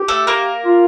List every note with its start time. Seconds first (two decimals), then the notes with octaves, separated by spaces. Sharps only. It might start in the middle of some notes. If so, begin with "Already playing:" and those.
Already playing: G4
0.08 A3 A4
0.27 A#3 A#4
0.65 F4